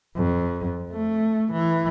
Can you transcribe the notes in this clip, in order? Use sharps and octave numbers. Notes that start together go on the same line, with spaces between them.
F2
A3
E3